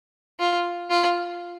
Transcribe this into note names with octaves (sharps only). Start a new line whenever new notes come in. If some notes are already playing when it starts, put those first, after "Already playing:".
F4
F4